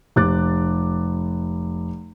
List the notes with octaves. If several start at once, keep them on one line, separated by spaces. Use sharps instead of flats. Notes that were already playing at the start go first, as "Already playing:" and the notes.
F1 D6 F#6 A6